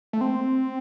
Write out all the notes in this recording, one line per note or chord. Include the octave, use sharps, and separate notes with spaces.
A3
C4